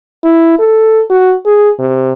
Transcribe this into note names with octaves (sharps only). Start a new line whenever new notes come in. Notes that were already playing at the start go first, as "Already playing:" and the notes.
E4
A4
F#4
G#4
C3